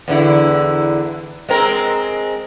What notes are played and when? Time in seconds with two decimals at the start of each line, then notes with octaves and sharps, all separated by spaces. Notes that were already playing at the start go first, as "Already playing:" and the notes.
0.08 E2 D3 E4
1.49 G#3 C4 A#4